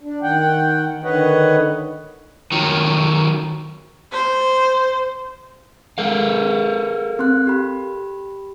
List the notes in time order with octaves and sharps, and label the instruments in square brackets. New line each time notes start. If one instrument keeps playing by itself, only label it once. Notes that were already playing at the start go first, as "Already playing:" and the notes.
[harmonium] D4
D#3 F#5 G5
D3 D#3 B4 C#5 D#5 F#5
[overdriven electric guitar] D#3 F#3
[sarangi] C5
[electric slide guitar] A4 A#4 F5
[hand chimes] C4 C6 F#6
G4 B5